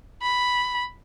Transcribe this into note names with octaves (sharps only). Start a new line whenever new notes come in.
B5